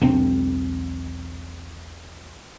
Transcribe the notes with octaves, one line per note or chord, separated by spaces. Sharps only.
E1 B1 C4 D4